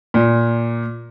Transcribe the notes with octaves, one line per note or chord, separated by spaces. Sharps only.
A#2